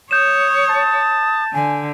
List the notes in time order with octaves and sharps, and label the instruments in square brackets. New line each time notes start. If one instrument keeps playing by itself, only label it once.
[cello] C#5 [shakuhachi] D#6 [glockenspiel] G6 E7
[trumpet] A5
[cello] D3 [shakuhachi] G#5